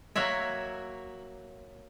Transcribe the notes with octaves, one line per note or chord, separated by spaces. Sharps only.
F#3 A#3 F#4 C#5 E5